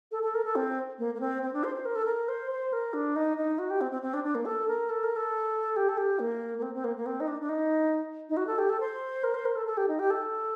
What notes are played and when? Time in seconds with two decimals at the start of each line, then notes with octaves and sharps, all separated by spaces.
0.11 A4
0.23 A4
0.34 A#4
0.45 A4
0.55 C4
0.99 A#3
1.14 A#3
1.20 C4
1.42 C4
1.53 D4
1.64 C5
1.75 C5
1.85 A#4
1.95 A4
2.05 A#4
2.28 C5
2.51 C5
2.73 A#4
2.93 D4
3.16 D#4
3.37 D#4
3.58 F#4
3.70 G4
3.81 C4
3.91 C4
4.02 C4
4.14 D4
4.24 D4
4.35 A#3
4.45 A4
4.68 A#4
4.89 A4
5.03 A#4
5.16 A4
5.76 G4
5.89 A4
5.97 G4
6.19 A#3
6.58 A#3
6.62 C4
6.74 C4
6.84 A#3
6.97 A#3
7.06 C4
7.20 D#4
7.27 D4
7.41 D4
7.49 D#4
8.29 D#4
8.37 F#4
8.47 A4
8.58 G4
8.69 A4
8.80 C5
9.23 A#4
9.34 C5
9.45 A#4
9.55 A4
9.66 A4
9.77 G4
9.88 D#4
9.99 G4
10.10 A4